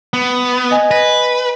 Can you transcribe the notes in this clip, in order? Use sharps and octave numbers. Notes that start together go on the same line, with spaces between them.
B3
D#5 G#5
B4 A#6